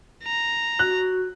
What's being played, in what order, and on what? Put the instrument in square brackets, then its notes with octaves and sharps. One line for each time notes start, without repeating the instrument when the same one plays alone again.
[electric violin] A#5
[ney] F#4 [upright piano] F#6